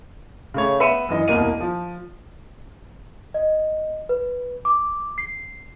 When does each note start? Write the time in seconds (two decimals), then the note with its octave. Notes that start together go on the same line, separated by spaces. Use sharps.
0.54 C#3 A3 C#5
0.80 B3 E5 B5 C#7 D#7 E7
1.09 F#2 E3 D#5
1.28 E1 C2 B2 A#3 D#5 D#7
1.60 F3
3.34 D#5
4.09 B4
4.65 D6
5.18 C7